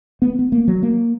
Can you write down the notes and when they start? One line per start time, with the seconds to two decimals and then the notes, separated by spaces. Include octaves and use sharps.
0.22 B3
0.39 B3
0.52 A#3
0.68 F#3
0.83 A#3